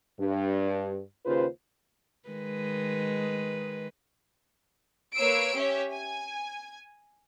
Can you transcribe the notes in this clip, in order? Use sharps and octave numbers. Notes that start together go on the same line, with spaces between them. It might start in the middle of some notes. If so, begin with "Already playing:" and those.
G2
D#2 C#3 F4 B4 C5
D#3 G#3 B4
A#3 B4 C#5 E6 C7 D7
C#4 G4 C#5 E5
G#5